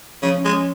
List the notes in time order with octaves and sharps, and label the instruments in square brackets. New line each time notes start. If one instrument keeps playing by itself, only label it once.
[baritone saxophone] C#3 [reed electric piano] F3
[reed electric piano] C#4
[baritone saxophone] G#3
[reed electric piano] C#4